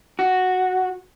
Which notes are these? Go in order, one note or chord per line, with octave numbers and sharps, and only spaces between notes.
F#4